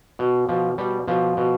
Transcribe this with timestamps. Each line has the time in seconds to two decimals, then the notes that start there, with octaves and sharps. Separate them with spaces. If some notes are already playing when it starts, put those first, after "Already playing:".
0.19 B2
0.49 B2 F3
0.78 B2 G3
1.08 B2 F3
1.37 B2